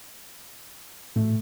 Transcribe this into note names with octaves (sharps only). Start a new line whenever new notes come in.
A2 A3